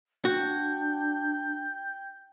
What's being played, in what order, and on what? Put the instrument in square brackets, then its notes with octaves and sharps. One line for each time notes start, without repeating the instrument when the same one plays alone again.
[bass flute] D4 [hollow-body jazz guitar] F#4 [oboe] G5